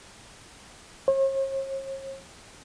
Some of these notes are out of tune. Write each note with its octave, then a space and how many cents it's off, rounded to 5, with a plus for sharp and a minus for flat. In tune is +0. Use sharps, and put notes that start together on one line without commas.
C#5 -45